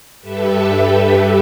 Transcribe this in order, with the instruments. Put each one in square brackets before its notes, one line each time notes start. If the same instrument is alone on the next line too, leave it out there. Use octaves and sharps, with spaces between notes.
[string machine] G2 G4 A4 B4 E5